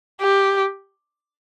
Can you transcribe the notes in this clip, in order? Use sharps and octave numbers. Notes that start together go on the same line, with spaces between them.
G4